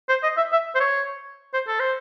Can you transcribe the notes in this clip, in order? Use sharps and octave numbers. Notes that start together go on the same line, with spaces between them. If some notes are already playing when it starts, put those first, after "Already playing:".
C5
D#5
E5
E5
C5
C#5
C5
A4
C5